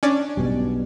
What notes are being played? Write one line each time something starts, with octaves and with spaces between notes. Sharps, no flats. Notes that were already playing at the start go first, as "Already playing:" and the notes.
C#4 D4
B1 B2 G3